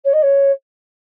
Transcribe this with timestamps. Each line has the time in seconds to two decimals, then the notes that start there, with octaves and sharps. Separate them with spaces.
0.04 C#5
0.13 D#5
0.22 C#5